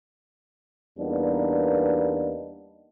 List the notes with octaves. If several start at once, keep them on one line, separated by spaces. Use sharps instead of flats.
E2 G3 A#3 B3 D4 D#4